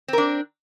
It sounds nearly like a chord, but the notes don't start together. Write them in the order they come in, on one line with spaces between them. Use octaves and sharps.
C4 A#4 D4